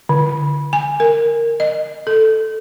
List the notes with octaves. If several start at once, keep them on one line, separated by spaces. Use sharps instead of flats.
D3
G#5
A#4
D#5
A4